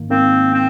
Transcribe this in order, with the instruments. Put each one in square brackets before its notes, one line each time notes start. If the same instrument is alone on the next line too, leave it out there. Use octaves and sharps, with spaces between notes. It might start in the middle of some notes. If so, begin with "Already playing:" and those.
Already playing: [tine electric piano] G#2 D#3 A#3
[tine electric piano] G#2 D#3 A#3 [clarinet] C4
[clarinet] C4